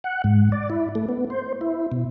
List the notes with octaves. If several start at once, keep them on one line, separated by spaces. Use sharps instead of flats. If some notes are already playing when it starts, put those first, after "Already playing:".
F#5
G#2
D5
E4
A3
B3
C5
E4
B2